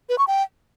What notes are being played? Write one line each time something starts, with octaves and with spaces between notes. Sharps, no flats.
B4
C#6
G5